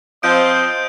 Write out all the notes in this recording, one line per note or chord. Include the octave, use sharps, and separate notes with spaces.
F3 C4 D#5 D#6 G6 D7